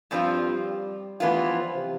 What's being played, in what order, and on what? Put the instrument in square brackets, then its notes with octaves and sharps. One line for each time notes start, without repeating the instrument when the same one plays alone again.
[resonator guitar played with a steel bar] G2 F3 C4 F4 [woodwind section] G3
[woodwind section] G3
[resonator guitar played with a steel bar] E3 B3 F4 [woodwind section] A3
[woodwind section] G3
F3
F3
C3